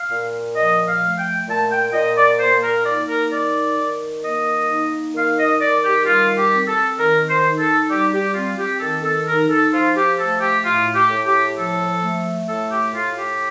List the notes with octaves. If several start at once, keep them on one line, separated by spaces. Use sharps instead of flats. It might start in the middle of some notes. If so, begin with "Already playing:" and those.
Already playing: F5
A#2
F3 D#5
F5
A3
G5
A#2 A5
G5
A#2 D#5
D5
A#3 C5
A#4
D#4 D5
A#4
D#3 D5
D#3
A#3 D#5
D#4
D#3 F5
D#5
D#3 D5
G4
G3 F4
G4
C4
A4
D#3 A#4
C5
D#4
A4
G3 G4
G4
C4 F4
G4
D#3 A4
A4
D#4 A#4
A4
F3 F4
G4
A3 A4
G4
A2 F4
G4
A2
G4
F3 A4
A3
A2 A4
G4
A2 F4
G4